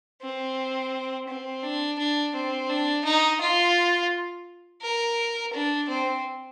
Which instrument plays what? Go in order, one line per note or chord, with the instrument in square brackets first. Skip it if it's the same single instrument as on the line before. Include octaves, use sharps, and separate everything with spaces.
[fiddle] C4
C4
D4
D4
C4
D4
D#4
F4
A#4
D4
C4